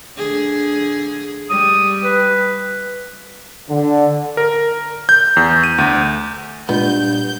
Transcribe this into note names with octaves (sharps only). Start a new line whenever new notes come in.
D3 G#4
G3 D#6
B4
D3
A#4
G6
E2
D#7
D2
G2 A#2 G#3 B3 G6